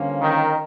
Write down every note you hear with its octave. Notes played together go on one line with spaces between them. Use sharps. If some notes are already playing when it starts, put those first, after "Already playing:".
Already playing: G2 D3 F3 A#3 C#4
D#3